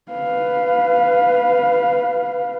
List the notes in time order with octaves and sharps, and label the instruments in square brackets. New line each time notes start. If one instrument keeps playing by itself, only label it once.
[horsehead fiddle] B4 F5